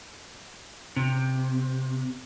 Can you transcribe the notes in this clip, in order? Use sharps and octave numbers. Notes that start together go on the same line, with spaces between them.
C3